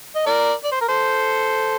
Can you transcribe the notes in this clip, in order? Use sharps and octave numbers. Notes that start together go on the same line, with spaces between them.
D#5
A#4 D5
D5
C5
A#4
A4 C5